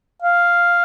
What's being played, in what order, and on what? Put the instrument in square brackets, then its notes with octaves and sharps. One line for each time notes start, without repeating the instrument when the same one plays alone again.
[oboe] F5